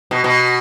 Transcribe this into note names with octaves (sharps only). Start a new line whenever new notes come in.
B2
B2